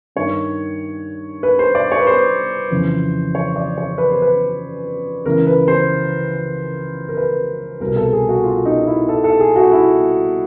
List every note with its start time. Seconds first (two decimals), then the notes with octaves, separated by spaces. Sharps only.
0.16 G2 D#3 C#5
1.43 B4
1.59 C5
1.75 D5
1.92 C#5
1.99 B4
2.07 C5
2.71 F2 C#3 E3
3.35 C#5
3.56 D5
3.78 C#5
3.98 B4
4.10 C5
4.22 B4
5.26 C#2 C#3 E3 A#4
5.47 B4
5.68 C5
7.09 A#4
7.17 B4
7.80 C2 B2 A#4
7.96 A4
8.13 G#4
8.29 F#4
8.44 F4
8.65 D#4
8.87 E4
9.09 A4
9.24 A4
9.40 G#4
9.56 F#4
9.72 E4